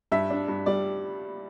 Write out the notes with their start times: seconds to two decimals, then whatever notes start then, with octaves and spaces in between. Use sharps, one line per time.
0.12 G2 E5
0.30 D4
0.48 G2
0.66 G3 D5